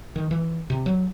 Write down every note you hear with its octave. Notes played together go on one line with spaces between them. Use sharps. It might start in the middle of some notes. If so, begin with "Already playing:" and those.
D#3
E3
C3
F#3